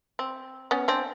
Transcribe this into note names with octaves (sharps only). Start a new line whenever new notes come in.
C4
B3 C#4
C4 D4